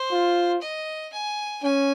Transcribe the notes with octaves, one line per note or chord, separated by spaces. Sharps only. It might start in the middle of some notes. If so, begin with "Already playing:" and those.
Already playing: C5
F4
D#5
G#5
C#4 G#5